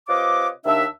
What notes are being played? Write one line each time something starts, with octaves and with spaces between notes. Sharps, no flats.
C3 F4 B4 C#5 D#5 D6
D#2 D4 E5